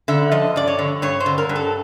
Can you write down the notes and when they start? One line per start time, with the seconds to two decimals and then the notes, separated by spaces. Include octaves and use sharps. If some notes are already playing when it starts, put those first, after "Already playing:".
0.08 D3 E5
0.32 F3 D#5
0.56 G2 D5
0.67 C#5
0.79 D3
1.02 G2 C#5
1.20 C5
1.26 D3
1.38 A#4
1.49 G2
1.56 A4